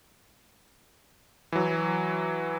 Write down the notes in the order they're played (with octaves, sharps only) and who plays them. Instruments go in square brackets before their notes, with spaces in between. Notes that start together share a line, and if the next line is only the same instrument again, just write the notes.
[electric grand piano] E3 F#3